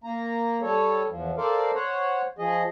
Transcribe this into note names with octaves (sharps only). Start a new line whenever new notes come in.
A#3 A#5
G3 A4 C#5
E2 F3
A4 A#4 C5 D5 F5
C5 C#5 F#5
F3 G#4 D#5